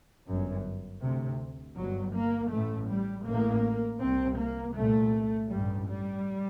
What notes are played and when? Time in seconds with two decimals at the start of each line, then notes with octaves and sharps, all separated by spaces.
0.27 G1 F#2
1.02 D2 C3
1.77 G1 G2 F#3
2.14 A#3
2.51 A1 A2 A3
2.89 G3
3.26 A1 A2 A#3
4.01 C2 C3 C4
4.38 A#3
4.76 C2 A#2 A3
5.50 A1 G2 G3
5.88 G3